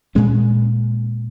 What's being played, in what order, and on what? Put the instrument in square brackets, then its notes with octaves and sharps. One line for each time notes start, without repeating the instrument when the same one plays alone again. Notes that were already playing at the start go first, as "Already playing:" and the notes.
[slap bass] A#2 G#3 C#4